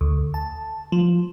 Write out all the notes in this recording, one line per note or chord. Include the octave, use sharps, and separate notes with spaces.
D2
A5
F3